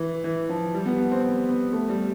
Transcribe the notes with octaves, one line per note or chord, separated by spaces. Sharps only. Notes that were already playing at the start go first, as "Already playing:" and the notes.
Already playing: E3
E3
F3
G3
B3
B3
C4
C4
B3
A3
G3